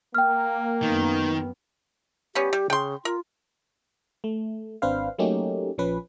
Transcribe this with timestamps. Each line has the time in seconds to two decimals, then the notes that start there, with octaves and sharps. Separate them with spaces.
0.15 A#3 G5 F6
0.82 F#2 D#3 B3
2.35 G3 B3 C#4 G4
2.53 G3
2.70 C#3 G5 C6
3.05 F4 A#4
4.24 A3
4.82 G#1 C4 D4 B4 C5 F5
5.18 F#3 A3 A#3 C#4 D#4 G4
5.78 A#1 F3 C#4 B4